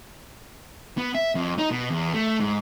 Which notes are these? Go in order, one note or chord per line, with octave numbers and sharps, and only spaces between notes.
B3
E5
F2
D#4
B2
E2
A3
G#2